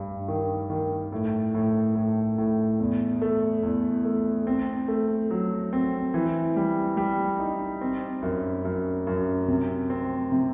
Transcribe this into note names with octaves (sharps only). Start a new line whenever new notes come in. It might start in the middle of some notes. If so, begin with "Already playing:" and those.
Already playing: G2
D#3
D#3
A2
A2
A2
A2
E2
A3
E2
A3
C4
A3
F#3
C4
E3
G3
G3
D#4
C4
F#2
F#2
F#2
C3
C4
C3